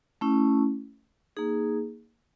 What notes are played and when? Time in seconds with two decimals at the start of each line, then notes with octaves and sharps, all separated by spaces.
0.21 A3 C#4 E4
1.37 A#3 D#4 G#4